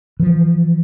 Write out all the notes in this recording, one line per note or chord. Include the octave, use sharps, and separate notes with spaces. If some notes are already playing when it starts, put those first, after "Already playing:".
E3 F3